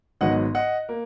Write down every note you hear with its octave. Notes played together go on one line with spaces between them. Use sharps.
G#1 G#2 F#3 B3 D#5 F#5
D#5 F#5
A#3